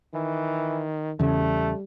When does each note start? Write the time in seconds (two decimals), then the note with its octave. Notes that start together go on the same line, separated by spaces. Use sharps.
0.14 D#3 E3
1.19 E2 C#3 G3 A3